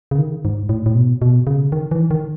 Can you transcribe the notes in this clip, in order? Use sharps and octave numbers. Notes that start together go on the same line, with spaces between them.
C#3
D#3
G#2
A2
A2
B2
B2
C#3
D#3
E3
D#3